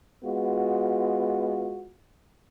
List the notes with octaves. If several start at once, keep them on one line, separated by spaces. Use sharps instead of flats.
G#3 B3 F4 F#4